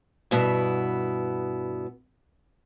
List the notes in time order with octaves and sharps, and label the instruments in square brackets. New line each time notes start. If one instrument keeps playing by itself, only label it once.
[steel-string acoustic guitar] G2 B2 B3 E4